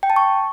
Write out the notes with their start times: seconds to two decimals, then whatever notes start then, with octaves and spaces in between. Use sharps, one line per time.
0.03 G5
0.10 A5
0.16 C#6